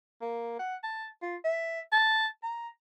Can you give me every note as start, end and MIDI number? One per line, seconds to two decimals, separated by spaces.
0.22 0.58 58
0.59 0.76 78
0.83 1.07 81
1.22 1.36 65
1.44 1.80 76
1.92 2.26 81
2.43 2.68 82